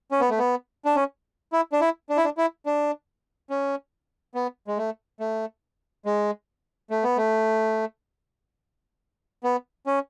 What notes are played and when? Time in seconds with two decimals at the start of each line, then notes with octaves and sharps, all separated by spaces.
0.11 C#4
0.20 B3
0.30 A3
0.38 B3
0.85 D4
0.96 C#4
1.53 E4
1.72 D4
1.81 E4
2.10 D4
2.17 E4
2.25 D4
2.37 E4
2.66 D4
3.50 C#4
4.35 B3
4.67 G#3
4.77 A3
5.20 A3
6.05 G#3
6.90 A3
7.04 B3
7.17 A3
9.44 B3
9.87 C#4